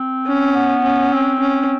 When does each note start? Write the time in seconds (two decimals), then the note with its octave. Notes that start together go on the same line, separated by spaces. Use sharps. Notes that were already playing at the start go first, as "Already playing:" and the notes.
Already playing: C4
0.27 C#4
0.55 B3
0.84 C#4
1.12 C4
1.41 C#4